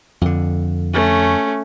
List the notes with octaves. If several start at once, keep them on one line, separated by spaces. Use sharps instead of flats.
F2 D3
A3 C#4